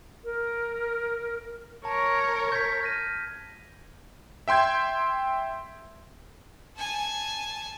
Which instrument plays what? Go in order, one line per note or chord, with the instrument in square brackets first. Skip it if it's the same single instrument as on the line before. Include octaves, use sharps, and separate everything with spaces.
[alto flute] A#4
[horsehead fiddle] A#4 C#5 [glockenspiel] A5
[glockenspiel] G6 G#6 B6
F6 A#6 D#7
[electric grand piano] E5 G5 C6 G6 G#6
[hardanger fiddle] G#5 A5